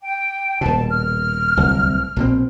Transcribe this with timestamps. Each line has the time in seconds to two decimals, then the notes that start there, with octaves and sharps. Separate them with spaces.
0.03 G5
0.61 D#1 B2 A5
0.90 F6
1.57 D1 C2
2.16 A#1 B2 C4